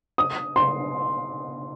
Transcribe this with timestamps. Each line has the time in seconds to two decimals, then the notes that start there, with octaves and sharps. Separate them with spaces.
0.18 D#6
0.56 C6